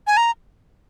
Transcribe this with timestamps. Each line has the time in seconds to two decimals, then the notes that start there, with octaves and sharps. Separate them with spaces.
0.07 G#5
0.17 A#5